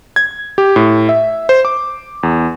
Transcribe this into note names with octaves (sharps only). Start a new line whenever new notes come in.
G#6
G4
A2
E5
C5
D6
E2